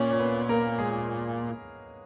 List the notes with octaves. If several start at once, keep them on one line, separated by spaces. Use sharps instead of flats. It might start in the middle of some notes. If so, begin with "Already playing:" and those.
Already playing: A#2 C#4 C#5
C#5
B3 B4
A#3 A#4
G#3 G#4